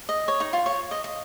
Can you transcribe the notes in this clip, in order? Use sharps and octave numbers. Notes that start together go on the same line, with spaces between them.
D#5
C#5
D#4
F4
C#5
D#5
D#5